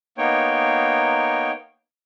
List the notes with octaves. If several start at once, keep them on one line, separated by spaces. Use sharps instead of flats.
A#3 B3 D#4 C#5 G5